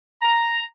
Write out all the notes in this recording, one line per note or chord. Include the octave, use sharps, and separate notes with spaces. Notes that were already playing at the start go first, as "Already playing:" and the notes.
A#5